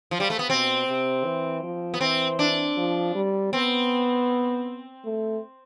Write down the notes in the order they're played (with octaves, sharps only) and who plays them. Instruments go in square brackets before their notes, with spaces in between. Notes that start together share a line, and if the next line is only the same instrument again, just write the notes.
[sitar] F3
G3
A3
B3
[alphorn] B2 [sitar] C4
[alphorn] C3
E3
F3
[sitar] B3
[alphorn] E3 [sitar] C4
[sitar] D4
[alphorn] F3
G3
[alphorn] B3 [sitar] C4
[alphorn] A3